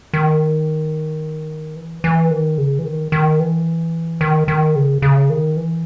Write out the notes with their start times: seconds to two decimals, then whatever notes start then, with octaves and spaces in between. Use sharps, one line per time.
0.14 D#3
1.76 E3
2.04 E3
2.31 D#3
2.58 C#3
2.79 E3
2.85 D#3
3.12 D#3
3.40 E3
4.21 D#3
4.48 D#3
4.76 C#3
5.02 C#3
5.30 D#3
5.57 E3